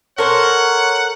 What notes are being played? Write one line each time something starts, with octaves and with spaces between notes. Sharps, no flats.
A4 A#4 C5 C#5 F#5